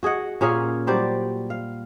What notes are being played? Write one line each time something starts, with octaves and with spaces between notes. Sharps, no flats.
F#4 G#4 D#5 F#5
A#2 C#4 G#4 F5
F#3 G3 C5 D5
F5